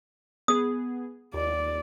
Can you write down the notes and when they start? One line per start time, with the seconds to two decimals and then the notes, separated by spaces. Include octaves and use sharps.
0.48 B3 G#4 D#6
1.34 D#2 D5